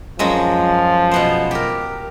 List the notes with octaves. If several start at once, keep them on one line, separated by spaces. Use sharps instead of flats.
F#2 F3 F#3 G#3
B2 B3 C5
G4 A#4